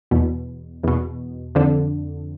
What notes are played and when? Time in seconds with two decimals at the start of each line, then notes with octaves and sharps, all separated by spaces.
0.11 E2 B2
0.84 E2 B2
1.55 F2 D3